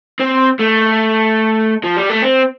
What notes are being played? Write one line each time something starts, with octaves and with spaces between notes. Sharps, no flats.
C4
A3
F3
G3
A3
C4